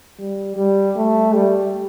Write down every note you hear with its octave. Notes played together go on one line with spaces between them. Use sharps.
G3
G3
A3
G3